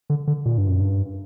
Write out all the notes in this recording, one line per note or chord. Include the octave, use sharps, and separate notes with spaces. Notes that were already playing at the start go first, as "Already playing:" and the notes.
D3
D3
A#2
G2
F#2
G2